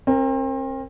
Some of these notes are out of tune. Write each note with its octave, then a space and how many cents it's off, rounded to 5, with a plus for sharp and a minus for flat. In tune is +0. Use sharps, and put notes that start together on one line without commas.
C4 +35 A#4 -10